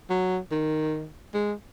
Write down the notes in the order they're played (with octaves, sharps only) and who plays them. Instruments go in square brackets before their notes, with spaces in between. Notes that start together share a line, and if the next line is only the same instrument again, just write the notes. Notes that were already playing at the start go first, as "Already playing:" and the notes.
[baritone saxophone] F#3
D#3
G#3